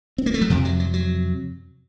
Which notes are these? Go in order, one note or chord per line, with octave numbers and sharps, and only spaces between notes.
C4
A#3
A3
F#3
F2 C3 F3
F#3
F#3
F#3